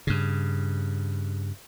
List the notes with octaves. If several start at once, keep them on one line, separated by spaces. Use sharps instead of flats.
G2 C#3